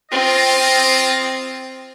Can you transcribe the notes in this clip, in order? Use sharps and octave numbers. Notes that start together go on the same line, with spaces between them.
C4 F4 D#5